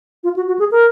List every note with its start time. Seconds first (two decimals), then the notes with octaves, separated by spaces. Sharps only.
0.24 F4
0.36 F#4
0.48 F#4
0.59 G#4
0.71 A#4